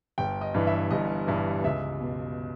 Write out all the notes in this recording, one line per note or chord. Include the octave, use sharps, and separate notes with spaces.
G1 G5
D#5
G2 E3
E5
G1 D#5
G2 E3
C#2 E5
B2